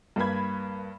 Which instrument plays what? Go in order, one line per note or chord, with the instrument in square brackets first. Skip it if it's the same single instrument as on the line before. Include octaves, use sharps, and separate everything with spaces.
[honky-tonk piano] G2 A#3 B4 B5 G#6